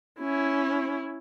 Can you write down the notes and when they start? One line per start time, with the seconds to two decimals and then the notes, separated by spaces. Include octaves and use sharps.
0.20 C#4 E4